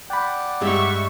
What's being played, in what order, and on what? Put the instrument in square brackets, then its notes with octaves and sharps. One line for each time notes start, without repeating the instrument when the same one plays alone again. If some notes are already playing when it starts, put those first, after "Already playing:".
[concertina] D5 F#5 [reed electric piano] G5 B5
[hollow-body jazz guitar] G2 G3 G#3 [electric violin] E5 C#6